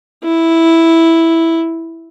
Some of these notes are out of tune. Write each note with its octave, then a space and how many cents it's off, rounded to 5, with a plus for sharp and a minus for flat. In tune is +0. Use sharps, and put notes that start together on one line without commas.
E4 -5